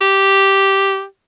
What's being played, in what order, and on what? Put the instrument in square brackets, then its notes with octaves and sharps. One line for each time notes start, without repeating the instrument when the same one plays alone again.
[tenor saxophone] G4